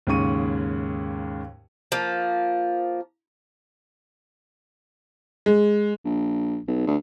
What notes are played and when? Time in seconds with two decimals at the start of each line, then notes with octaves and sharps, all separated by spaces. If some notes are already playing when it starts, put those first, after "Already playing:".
0.07 D#2 G#2 C#3 C#6 D#7
1.92 F3 A#3
5.46 G#3
6.05 A#1
6.68 B1
6.87 D2